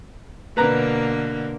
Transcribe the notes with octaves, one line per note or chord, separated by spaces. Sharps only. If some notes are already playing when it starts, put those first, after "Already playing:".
B2 D3 A#3 B4 A#5